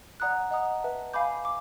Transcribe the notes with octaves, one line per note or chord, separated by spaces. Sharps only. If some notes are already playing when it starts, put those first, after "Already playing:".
D5 F#5 A#5 D#6 F#6
D#5 F#5 A#5 D#6
B4 E5 A5
F5 G#5 B5 D6 G6
D6